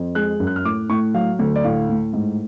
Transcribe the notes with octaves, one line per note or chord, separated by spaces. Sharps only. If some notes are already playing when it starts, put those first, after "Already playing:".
Already playing: F2
G#3 F#6
F#2
F#6
F6
A2 D6
A2 C#6
F#3 F5
D2
D5
A2 F5
A2
G#2